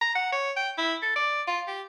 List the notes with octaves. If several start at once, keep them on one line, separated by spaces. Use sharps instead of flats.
A#5
F#5
C#5
G5
E4
A4
D5
F4
G4